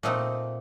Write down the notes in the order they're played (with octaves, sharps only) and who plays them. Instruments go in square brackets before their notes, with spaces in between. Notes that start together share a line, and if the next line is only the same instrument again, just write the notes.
[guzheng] A#2 A3 C4 D#4 D#5